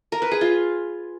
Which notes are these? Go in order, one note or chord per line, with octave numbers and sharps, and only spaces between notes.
A#4
B4
G#4
F4